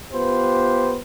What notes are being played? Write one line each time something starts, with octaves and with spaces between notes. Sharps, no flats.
B3 F4 G4 B4 C5